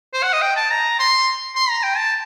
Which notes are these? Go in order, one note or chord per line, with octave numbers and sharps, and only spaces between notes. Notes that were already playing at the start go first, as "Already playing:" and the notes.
C5
F#5
D#5
G5
A5
A#5
C6
C6
A#5
G5
A5